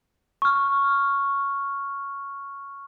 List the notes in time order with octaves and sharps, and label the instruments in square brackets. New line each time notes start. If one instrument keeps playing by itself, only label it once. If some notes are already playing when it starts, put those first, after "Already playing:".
[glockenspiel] C#6 F6